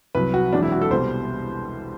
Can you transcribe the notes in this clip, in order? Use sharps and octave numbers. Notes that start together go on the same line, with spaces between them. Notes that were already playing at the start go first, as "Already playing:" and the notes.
C2 C3 F#3 B4
F#4
E1 E2 C3 F#3 D4
E4
F#4
A4
C2 B2 G3 C5